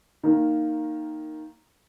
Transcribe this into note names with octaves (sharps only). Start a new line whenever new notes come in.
D#3 A#3